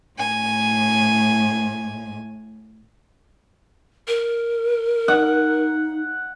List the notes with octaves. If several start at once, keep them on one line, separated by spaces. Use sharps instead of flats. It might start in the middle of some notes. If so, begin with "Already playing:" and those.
A2 G#5
A#4
D#4 F#5